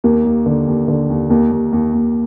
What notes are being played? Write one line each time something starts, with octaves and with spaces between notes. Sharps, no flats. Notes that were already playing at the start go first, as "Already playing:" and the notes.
D#2 A#3
D#2
D3
D#2
D3
D#2
D#2 A#3
D#2
D#2
D#2